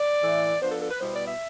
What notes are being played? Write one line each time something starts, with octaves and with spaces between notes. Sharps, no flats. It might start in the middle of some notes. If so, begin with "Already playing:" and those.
Already playing: D5
A2 E3 A3
F3 B3 D4 C5
A4
A4
B4
B2 G3 B3 E4 C5
D5
E5